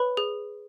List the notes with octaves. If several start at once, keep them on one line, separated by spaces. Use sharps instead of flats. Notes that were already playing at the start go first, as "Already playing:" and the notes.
Already playing: B4 C#5 B5
G#4